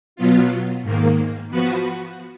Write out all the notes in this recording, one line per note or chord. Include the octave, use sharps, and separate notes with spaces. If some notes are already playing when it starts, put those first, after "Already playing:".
B2 F#3 B3 F4
G#2 D#3 A#3
F3 B3 F#4 B4